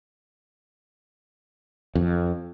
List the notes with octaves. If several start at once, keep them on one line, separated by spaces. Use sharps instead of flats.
F2